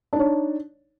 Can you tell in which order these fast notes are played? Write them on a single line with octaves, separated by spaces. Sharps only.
D4 D#4 C#5